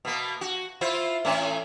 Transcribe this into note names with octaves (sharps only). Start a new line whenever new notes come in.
B2 A#3
F#4
E4 F4 C5
A2 E3 C#4